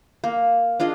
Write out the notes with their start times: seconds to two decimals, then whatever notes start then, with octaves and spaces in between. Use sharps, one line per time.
0.24 A#3
0.80 D4 F4 G#4 D#5